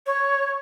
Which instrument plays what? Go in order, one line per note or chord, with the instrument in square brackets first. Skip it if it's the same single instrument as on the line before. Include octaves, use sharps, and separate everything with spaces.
[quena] C#5